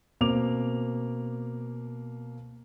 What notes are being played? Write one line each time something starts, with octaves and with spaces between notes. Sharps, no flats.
B2 A#3 C4 D6 F7